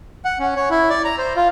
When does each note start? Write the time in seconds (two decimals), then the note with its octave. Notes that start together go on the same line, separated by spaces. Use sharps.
0.25 F#5
0.39 C#4
0.56 C#5
0.70 E4
0.90 D5
1.05 A#5
1.18 C5
1.36 F4